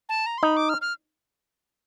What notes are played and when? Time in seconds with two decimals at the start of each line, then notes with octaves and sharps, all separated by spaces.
0.09 A5
0.26 A#5
0.38 C6
0.43 D#4 B5
0.57 D6
0.69 F6
0.81 F6